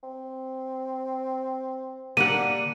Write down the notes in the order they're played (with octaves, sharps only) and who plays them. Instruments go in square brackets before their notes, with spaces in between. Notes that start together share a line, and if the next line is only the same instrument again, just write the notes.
[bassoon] C4
[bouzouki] D3 G3 D4 [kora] A#3 F#5 [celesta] D#7